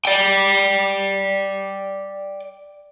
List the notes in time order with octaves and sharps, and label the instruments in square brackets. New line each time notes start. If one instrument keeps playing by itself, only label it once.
[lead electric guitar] D5 G5